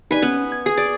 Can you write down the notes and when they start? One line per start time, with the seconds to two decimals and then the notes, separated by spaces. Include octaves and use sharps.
0.11 D#4 G4 B4 D5 G#5
0.22 B3 C#4
0.52 G#6
0.66 G#4
0.77 D5